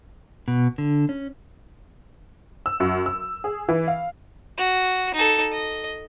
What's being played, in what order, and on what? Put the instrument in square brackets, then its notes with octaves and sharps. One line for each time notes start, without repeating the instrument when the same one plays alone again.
[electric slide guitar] B2
D3
C#4
[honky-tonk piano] E6
F#2
E6
G#4
E3
F5
[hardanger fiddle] F#4
D#4 A4
D#5